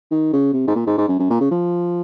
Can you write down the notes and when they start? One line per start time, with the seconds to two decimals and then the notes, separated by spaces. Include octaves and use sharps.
0.11 D#3
0.33 C#3
0.54 C3
0.67 G#2
0.75 A#2
0.86 G#2
0.98 G#2
1.08 F#2
1.19 F#2
1.30 A#2
1.41 C#3
1.51 F3